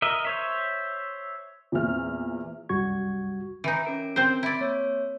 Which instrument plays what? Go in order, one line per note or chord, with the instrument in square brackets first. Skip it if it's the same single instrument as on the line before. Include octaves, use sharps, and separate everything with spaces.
[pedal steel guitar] A#4 D#5 E5
C5 C#5 E5
[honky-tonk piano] E2 A#2 C4 E5 F6
[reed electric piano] C2 F#2 G3 F#4 C#6 G#6
[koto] E3 D#4
[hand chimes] C#4 A#4 D7
[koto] C4 C5
E4 D5
[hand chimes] A#3 C#5